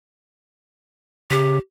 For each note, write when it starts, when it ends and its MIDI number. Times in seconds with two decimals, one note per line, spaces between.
1.31 1.59 49
1.31 1.57 67